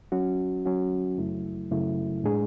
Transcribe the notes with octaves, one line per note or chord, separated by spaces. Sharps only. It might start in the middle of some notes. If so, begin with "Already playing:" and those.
F#3 C#4 F#4
F#3 C#4 F#4
F#2 C#3 F#3 A3 E4
F#2 C#3 F#3 A3 E4
A2 G#3 D4 G#4